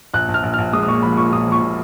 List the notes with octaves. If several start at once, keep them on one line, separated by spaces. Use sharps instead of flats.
A#1 F#6
A#1
F6
A#1
A#1 F6
G#3 D#6
D#6
A#2 C#6
F3 B5
A#2 C#6
A#2 D#6
F3 C#6
A#2